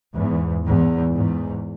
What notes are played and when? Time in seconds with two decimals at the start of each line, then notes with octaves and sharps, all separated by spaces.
0.16 E2 G#2
0.65 E2 G#2
1.16 E2 G#2